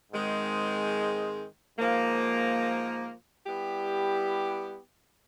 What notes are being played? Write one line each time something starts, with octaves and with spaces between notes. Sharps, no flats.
G#2 D#3 G#3 C4
G#2 F3 A#3
G3 B3 E4 G4